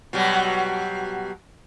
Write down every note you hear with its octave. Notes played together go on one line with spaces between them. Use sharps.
B2 F#3 G3